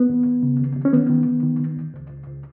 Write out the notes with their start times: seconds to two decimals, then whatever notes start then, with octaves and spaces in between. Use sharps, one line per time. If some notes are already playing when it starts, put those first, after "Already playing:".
Already playing: B3
0.09 D#2
0.26 D#2
0.43 C#3
0.60 D#2
0.76 D#2
0.85 C#4
0.93 D#3 B3
1.10 D#3
1.26 D#3
1.43 D#3
1.59 D#3
1.76 D#2
1.94 C#2
2.10 C#2
2.27 C#2